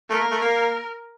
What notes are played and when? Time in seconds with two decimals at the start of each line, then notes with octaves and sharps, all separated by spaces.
0.10 A3 A#4
0.21 A#3
0.31 A3
0.41 A#3